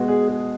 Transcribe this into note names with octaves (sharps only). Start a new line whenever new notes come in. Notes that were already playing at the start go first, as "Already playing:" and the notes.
Already playing: B2 G#3 B3 F#4
G#4
G#4